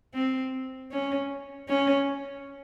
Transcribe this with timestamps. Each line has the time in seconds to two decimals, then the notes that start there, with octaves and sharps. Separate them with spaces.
0.15 C4
0.92 C#4
1.69 C#4